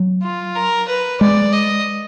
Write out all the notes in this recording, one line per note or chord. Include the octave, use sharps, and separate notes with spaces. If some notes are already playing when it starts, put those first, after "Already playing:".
Already playing: F#3
F4
A#4
B4
G#3 D5
D#5